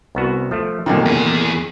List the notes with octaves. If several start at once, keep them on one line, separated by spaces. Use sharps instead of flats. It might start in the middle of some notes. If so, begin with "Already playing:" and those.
C2 B3 F#4
F3 A3
C2 F#2 A#2 D#3 A3 A#3
E2 G#4